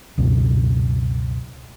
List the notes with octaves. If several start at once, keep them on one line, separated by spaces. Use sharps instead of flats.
C#2 F#2 B2